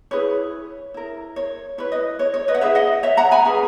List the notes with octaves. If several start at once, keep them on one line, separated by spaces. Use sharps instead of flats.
E4 G#4 B4 C#5
E4 A#4
C#5
E4 B4 C#5
B4 D#5
C#5
C#5
B4 D#5
F#5
E4 G#4 B4 C#5 E5
D#5 F#5
C#5 E5
F#5 A#5
G#5 B5
C#4 G#4 B4